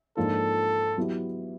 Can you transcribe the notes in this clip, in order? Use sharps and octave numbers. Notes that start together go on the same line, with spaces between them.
G#2 F3 A#3 D4 F4 A4
F#3 B3 E4 G4